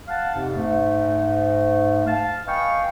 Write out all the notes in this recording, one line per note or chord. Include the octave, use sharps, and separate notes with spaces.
F5 F#5 A5
F2 G#2 C3
G#2 A3
F5 A5
B4 D#5 F5 G5 G#5 C#6